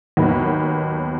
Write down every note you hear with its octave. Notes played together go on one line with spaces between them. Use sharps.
D#2 D#3 F#3 B3 D#4